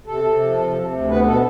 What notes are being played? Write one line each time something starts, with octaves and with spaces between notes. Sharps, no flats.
C3 A4
C3
F3
C3
C3
D2
B3 B4
B2 A4